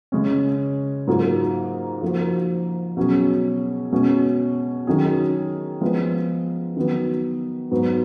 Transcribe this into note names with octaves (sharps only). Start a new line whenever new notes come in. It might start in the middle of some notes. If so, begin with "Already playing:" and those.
C#3 G#3 C#4
G#2 F#3 A#3 F4 G#4
F3 A#3 D#4 F#4
B2 F#3 C#4 G#4
B2 G#3 C#4
D#3 F#3 C#4 G#4
F3 G#3 B3 F4
D#3 F#3 B3
G#2 F#3 B3